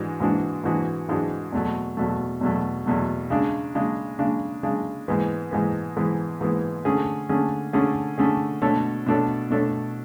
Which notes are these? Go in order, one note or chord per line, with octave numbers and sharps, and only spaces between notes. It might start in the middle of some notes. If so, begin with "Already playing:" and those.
Already playing: G#2 E3 G#3 D4 F#4
G#2 E3 G#3 D4 F#4
G#2 E3 G#3 D4 F#4
G#2 E3 G#3 D4 F#4
E2 B2 F#3 A3
E2 B2 F#3 A3
E2 B2 F#3 A3
E2 B2 F#3 A3
C#3 G#3 D4
C#3 G#3 D4
C#3 G#3 D4
C#3 G#3 D4
G#2 E3 G#3 B3
G#2 E3 G#3 B3
G#2 E3 G#3 B3
G#2 E3 G#3 B3
D3 A3 C#4 G#4
D3 A3 C#4 G#4
D3 A3 C#4 G#4
D3 A3 C#4 G#4
B2 A3 D4 A4 C#5
B2 A3 D4 A4 C#5
B2 A3 D4 A4 C#5